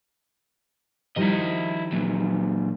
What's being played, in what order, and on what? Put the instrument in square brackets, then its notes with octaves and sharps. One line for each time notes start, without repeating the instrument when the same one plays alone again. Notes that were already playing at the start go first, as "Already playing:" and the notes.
[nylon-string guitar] D#3 F3 G3 [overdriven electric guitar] E4 D#5
[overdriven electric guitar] A#2 F#3